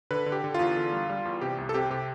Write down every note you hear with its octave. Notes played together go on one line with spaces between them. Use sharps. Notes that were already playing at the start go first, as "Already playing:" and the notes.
D3 B4
D3
G4
D3
E2 F4
D3
G3
G3
E2
C3 G4
C2
A4
C3 G4
C3 G4